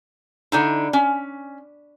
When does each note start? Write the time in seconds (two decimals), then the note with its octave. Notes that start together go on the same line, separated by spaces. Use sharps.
0.52 D3 D#4 E4
0.93 C#4